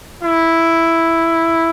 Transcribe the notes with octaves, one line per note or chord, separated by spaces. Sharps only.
E4